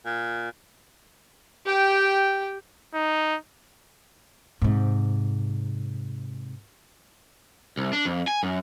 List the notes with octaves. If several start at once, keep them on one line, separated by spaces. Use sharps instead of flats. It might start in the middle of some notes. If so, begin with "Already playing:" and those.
A#2
G4 G5
D#4
G#2 C3
C2
D4
F2
G#5
F#2